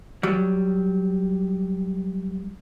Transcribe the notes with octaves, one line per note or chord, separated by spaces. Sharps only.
F#3 G3